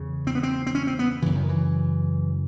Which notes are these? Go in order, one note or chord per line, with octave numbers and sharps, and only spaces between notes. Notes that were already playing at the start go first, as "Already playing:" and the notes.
Already playing: E2 C#3
C4
B3
C4
C4
C#4
C4
B3
F#2 C#3 E3
D#3
E3